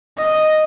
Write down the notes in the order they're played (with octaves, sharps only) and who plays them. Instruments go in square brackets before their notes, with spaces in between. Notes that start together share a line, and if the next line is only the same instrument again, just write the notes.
[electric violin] D#5